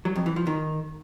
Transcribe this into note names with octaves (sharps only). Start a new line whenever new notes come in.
F#3
F2
E3
F3
D#3